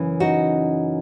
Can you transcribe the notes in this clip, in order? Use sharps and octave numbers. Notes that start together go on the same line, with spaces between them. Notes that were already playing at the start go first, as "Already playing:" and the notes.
Already playing: F#2 C#3 E3
D#4 F#4